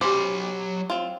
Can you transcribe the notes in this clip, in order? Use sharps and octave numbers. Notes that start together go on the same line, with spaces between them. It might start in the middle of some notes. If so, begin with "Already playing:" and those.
F#3 C#4 G4 C5 B5 D6
C4 F4